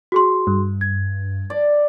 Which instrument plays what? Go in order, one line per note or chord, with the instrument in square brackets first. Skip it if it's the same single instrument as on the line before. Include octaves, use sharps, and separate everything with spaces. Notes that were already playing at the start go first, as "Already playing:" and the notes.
[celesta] F#4 G#4 C6
[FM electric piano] G2
[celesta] G#6
[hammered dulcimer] D5